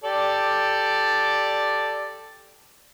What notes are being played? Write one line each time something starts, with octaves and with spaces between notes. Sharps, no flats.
G4 A4 D5